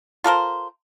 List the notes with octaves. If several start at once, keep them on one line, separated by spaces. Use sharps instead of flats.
F4 A4 A#4 C5